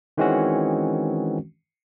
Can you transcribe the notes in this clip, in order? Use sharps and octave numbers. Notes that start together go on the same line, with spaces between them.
D#3 E3 G#3 C4 C#4 F#4